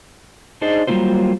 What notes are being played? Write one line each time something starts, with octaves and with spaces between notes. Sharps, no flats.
D4 D#4 G#4 C5 D5 D#5
F#3 G3 A#3 E4 F4 C5